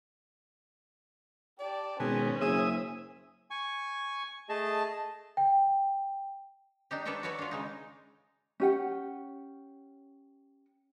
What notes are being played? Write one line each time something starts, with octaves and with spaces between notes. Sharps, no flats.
G4 D5 A5
G#1 B2 C#4 G#4 C5
F#1 G#4 E5 D#6
G#5 C#6
A3 G#4 D#5 A5
G5
D4 D#4 G4
D4 A4 B4 C#5 D#5 G5
F#4 A4 B4 C#5 D5 E5
D4 F4
C#3 G#3 D#4
C#4 G4 F#5